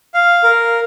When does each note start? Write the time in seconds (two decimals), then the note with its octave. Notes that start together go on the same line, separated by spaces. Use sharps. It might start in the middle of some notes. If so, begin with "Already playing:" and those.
0.14 F5
0.44 A#4